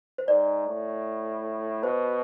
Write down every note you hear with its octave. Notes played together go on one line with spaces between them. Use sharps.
C5
G#2 D5
A2
B2 C5